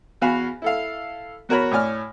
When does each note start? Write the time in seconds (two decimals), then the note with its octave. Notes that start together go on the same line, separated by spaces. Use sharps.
0.22 E2 F#4 F5 G#5 B5
0.62 E4 A4 F5
1.49 E2 F#4 A#4 C#5 B5
1.71 A2 C#5 D5 G#5 F6